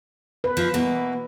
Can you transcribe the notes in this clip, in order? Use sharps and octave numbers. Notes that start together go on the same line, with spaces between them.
B4
F3
B2 E3 A#3